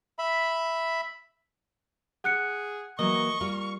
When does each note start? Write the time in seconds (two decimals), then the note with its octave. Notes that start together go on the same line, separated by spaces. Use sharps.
0.19 E5 B5
2.24 G#4 F#5 F#6 C#7
2.99 E3 F#3 A#3 D#5 C#6
3.41 G3 A#3 F4 F5